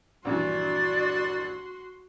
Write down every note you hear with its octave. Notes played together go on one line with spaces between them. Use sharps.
A#1 G2 E3 F#4 D5 C6